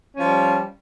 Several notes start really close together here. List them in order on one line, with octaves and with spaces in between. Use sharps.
C#4 F3 G3